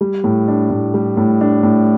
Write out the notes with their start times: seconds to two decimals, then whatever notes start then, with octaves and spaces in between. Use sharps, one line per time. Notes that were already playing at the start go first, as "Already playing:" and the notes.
0.01 G3
0.24 A2
0.48 D4
0.70 A2
0.94 G3
1.17 A2
1.41 D4
1.63 A2